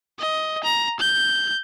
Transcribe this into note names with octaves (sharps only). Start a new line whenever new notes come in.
D#5
A#5
G6